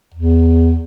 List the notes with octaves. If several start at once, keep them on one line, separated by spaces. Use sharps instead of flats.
E2